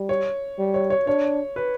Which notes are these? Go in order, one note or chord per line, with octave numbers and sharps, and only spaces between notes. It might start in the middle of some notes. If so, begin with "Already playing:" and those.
Already playing: G3
C#5
G3
C#5
C#5
D4 C#5
B4